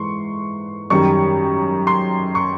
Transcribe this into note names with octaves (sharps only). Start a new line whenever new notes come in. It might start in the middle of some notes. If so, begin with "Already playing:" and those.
Already playing: G#2 E3 C6 C#6
F#2 D#3 G3 C#6
C6
C#6